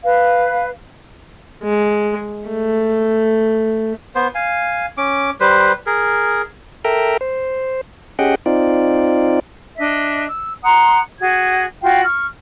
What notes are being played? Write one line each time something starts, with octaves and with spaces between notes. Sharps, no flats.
B4 F5
G#3
A3
B3 C5
F5 G#5
C#4 D6
G3 B4 C5
G#4 A#4
A4 A#4 E5 G5 A#5
C5
C#4 G4 G#4 D#5 F#5 G5
C4 D#4 F4 D5
D4 D#5 E5
E6
F#5 A#5 C6 D#6
F#4 G#4 G#6
F4 F#4 F5 G5
C#6 F6